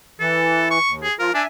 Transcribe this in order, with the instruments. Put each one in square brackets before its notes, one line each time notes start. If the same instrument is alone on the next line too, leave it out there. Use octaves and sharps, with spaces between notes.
[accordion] E3 [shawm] A4
[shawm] C#6
[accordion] D#2
[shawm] G#4
[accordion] F3 F4 [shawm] A#4
[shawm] D4 [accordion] E5 G#5